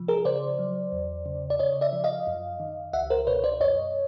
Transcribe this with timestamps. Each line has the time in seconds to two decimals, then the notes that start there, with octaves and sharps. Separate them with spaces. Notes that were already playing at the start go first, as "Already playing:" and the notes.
Already playing: C3 F3
0.08 G#4 A#4
0.25 C#3 C5 D5
0.59 F#3
0.92 E2
1.26 C#3
1.50 D5
1.59 C#3 C#5 D#5
1.81 D5 E5
1.93 F3
2.04 D#5 F5
2.27 F#2
2.60 D#3
2.93 C#2 E5 F#5
3.10 A#4 C5
3.27 B2 B4 C#5
3.44 C5 D5
3.60 F#2 C#5 D#5